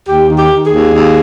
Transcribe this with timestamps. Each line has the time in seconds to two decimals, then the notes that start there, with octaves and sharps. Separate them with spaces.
0.08 D#2 G4
0.29 D#3
0.36 G4
0.50 D#3
0.64 G#4
0.71 D#2
0.92 D#2